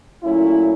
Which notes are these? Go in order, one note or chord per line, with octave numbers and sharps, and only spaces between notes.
A#2 F#3 A3 C#4 E4